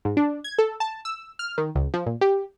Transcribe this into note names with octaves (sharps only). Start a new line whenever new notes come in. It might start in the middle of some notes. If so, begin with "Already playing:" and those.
G#2
D4
G#6
A4
A5
E6
F6
D#3
C#2
F3
A#2
G4